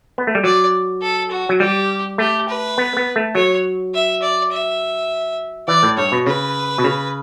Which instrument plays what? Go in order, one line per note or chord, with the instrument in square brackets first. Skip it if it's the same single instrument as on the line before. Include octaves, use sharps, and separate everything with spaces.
[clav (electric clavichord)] B3
A3
G3
[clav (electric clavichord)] F#3 [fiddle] D5
[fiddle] A4
F#4
[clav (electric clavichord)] F#3
[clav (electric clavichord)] G3 [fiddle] G4
[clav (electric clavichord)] A3 [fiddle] G4
[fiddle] B4
[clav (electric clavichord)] B3
B3
A3
[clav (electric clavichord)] F#3 [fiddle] C#5
[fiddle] E5
D5
E5
[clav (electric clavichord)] E3 [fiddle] D5
[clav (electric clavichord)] A2
[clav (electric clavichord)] G2 [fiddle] C#5
[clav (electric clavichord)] B2
[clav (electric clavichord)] C#3 [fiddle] B4
[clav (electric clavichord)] B2
C#3